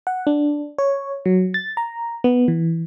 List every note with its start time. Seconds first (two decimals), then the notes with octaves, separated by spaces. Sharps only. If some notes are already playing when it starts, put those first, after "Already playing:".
0.07 F#5
0.27 D4
0.78 C#5
1.26 F#3
1.54 A6
1.77 A#5
2.24 B3
2.48 E3